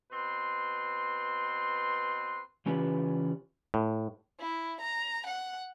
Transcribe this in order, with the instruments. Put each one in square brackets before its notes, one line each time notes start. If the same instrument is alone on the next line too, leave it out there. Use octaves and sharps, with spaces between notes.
[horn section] B2 C4 B4 C6
[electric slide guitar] C#3 E3 C#4 F4 G4 B4
[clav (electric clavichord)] A2
[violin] E4
A#5
F#5